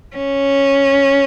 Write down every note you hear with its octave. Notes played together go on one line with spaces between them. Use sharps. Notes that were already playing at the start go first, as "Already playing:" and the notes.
C#4